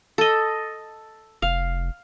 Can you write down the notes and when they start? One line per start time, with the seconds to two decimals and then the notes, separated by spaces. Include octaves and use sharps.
0.18 A4 D#5
1.42 F1 F5